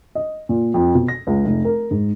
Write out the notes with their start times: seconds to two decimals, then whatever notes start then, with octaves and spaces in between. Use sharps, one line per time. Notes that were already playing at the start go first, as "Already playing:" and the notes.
0.15 D#5
0.49 A#2
0.74 F2
0.95 B2
1.08 A#6
1.27 C#2
1.45 F1
1.65 A#4
1.91 G#2